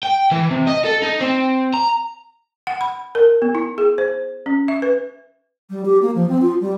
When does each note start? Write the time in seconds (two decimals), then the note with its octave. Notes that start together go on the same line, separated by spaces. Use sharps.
0.03 G5
0.32 E3
0.51 C3
0.67 D#5
0.85 A4
1.03 D#4
1.21 C4
1.74 A#5
2.67 F#5
2.81 B5
3.15 A#4
3.42 B3
3.55 E4
3.78 G#4
3.98 C5
4.46 C#4
4.68 E5
4.82 B4
5.70 G3
5.85 G4
6.02 A#3
6.15 F3
6.29 C4
6.42 F4
6.61 G3